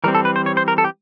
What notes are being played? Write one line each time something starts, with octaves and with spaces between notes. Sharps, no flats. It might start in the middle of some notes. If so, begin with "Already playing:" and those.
E3 G3 C4 A#4
A4
B4
C5
C#5
C5
A#4
A4
G4